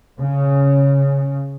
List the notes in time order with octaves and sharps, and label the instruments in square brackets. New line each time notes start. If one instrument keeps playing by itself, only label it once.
[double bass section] C#3